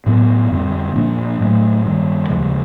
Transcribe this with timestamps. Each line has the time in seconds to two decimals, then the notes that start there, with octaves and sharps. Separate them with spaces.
0.06 A2 F#3 B3
0.51 F2 D3 G3 C4
0.95 A#2 F3 A#3 D4
1.41 A2 F#3 A3
1.86 G2 D#3 G3
2.29 D#2 C#3 F3 G#3